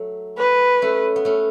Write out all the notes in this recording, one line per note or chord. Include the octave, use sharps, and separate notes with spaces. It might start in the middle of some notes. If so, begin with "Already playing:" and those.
Already playing: F#3 A3
B4
A3 C#4
B3
A3 C#4